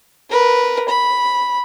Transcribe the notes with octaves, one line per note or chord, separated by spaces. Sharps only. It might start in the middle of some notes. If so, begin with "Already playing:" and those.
A#4 B4
B5